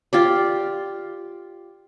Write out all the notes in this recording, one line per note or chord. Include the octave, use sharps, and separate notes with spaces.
F4 G4 D5